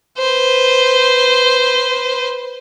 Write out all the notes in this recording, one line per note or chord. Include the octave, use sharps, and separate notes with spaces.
B4 C5